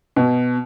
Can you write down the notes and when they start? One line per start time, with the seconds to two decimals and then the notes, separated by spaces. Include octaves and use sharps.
0.16 B2